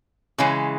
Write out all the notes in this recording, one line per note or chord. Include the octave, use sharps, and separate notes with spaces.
C#3 E3 G#3